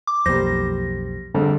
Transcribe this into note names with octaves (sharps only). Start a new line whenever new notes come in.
D6
B1 F2 G3 A#3 C5 A#6
G#1 F2 D3 G3